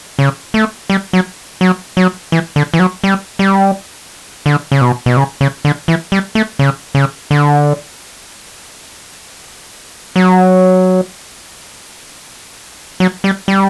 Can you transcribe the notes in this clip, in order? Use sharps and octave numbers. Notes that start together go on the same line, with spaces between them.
C#3
A3
G3
F#3
F#3
F#3
E3
D3
E3
F#3
G3
G3
D3
C#3
B2
B2
C#3
C#3
D3
E3
G3
A3
C#3
C#3
D3
F#3
F#3
G3
G3